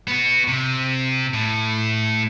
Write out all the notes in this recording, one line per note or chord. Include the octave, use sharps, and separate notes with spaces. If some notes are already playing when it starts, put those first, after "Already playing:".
B3 F#4
C3
A2